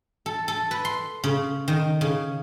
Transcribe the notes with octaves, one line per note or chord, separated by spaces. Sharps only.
A4
A4
B4
C6
C#3
D#3
C#3